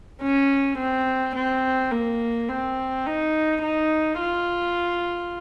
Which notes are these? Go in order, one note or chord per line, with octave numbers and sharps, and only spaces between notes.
C#4
C4
C4
A#3
C4
D#4
D#4
F4